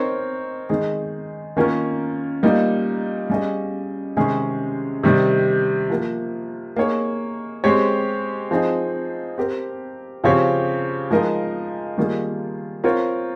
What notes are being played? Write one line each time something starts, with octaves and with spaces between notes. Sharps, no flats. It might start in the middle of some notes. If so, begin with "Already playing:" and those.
Already playing: C4 D#4 A#4 C#5
D#3 G#3 D#4 G#4
D#3 A#3 C#4 F4 A#4
A#2 G3 A#3 D#4
G3 C#4 G#4 D#5
C3 D#3 G#3 C#4 G#4
C3 D#3 G3
F3 A#3 F4
A#3 D#4 G#4 C#5
G#3 C4 G4 C#5
F3 C4 D#4 G#4
C4 G4 A#4
C#3 F3 C4 G4 C#5
F3 G#3 D#4 A#4 D#5
D#3 G3 A#3 F4 G#4
C4 F4 A#4 C#5